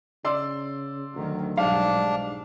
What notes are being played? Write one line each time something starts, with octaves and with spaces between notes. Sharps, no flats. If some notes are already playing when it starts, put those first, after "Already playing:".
C#3 D5 C6 E6
D2 D#3 F#3
B1 G#2 F#3 G3 D4 F5